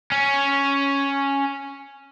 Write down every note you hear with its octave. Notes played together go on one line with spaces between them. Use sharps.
C#4